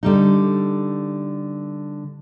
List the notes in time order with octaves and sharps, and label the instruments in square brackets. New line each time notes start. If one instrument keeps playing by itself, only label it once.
[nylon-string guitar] D3 G3 D#4